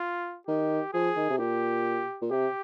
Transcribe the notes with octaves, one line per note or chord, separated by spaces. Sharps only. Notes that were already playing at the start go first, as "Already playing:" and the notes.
Already playing: F4
D#3 G4
F3 G#4
D#3
C3
A#2 G4
A#2
C3 G4